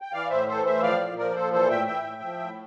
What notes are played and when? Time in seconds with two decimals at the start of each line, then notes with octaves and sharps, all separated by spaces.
0.02 G5
0.13 E3 D5 F5
0.30 A2 C5 E5
0.48 E3 A4 C5
0.65 A2 C5 E5
0.82 F3 D5 F5
1.01 A#2
1.17 F3 A#4 D5
1.30 D5
1.35 A#2 A4 C5
1.52 E3 A4 C5
1.70 A2 E5 G5
1.87 E3 E5 G5
2.04 A2
2.22 F3
2.40 A2